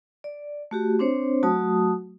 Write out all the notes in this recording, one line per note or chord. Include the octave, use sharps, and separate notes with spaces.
D5
A3 F#4 G4
C4 D4 C5 C#5
F#3 A3 F#4 A5 D#6